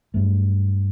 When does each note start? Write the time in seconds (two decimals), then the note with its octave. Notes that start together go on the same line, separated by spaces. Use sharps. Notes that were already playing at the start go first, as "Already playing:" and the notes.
0.14 G2 F#3 A3